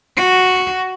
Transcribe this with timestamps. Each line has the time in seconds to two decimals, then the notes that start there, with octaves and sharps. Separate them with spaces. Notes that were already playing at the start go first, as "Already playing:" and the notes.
0.17 F#4